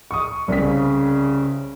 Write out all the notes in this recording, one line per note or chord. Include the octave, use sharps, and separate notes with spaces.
C#6 D#6
C2 C#3 C4 B6